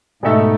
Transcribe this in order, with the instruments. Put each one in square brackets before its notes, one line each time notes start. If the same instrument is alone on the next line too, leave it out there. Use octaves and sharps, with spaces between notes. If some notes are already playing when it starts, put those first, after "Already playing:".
[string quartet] G#2 [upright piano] B2 A3 D#4 A4 E5